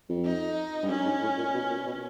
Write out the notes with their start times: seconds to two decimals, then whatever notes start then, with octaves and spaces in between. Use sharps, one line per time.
0.09 F2
0.25 D#4
0.83 G2
0.90 F#2 C#4
1.05 G#2
1.22 A2
1.38 A#2
1.54 B2
1.70 A#2
1.86 B2